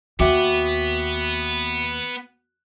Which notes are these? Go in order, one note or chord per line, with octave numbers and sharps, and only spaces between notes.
D#2 B3 F#4 E5 G5 D6